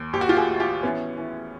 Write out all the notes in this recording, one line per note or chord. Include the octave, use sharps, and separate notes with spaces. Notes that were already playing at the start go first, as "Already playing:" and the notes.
Already playing: D#2
A#1 G4
F#4
F4 G4
F#4 G#4
A2 F#4
F4 G4
E3 B3 C#4
E3